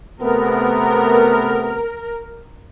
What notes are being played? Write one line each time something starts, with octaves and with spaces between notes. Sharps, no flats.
C3 A3 B3 A#4